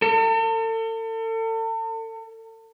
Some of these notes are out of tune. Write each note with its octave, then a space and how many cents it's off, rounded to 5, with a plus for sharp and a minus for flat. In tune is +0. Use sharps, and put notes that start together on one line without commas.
A4 +40